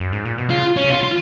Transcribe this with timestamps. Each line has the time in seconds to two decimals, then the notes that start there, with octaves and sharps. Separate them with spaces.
0.00 F#2
0.12 G#2
0.25 A#2
0.38 B2
0.50 C#3 F4
0.77 C#4
0.84 C#3
0.90 B2 F4
1.03 F4